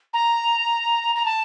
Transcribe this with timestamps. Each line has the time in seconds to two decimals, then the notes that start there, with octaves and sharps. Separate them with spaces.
0.13 A#5
1.15 A#5
1.25 A5